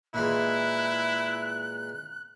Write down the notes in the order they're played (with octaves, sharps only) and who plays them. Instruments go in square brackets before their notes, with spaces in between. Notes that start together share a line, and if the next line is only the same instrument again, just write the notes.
[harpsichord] A#2 E3 G#3 [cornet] E4 [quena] F#6